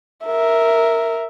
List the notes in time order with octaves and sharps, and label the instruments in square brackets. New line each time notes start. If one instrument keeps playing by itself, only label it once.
[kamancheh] A#4 E5